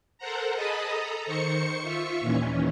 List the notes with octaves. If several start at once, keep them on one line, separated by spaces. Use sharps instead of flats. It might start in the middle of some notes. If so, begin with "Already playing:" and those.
A4 A#4 C5 F#5 A#5
G#4 D#5 A5 B5 D#6
A4 A#5
D#3 C5 C#6 C#7
F4 E5 C#6
D#2 A#2 D#3 E3 C#4